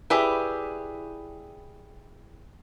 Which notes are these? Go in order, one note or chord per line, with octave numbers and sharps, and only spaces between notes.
E4 G4 G#4 B4 D5